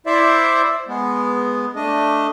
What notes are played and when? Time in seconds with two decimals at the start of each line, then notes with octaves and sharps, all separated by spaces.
0.06 E4 C5 D5 E5
0.88 G#3 B3
1.76 A3 D4 D#5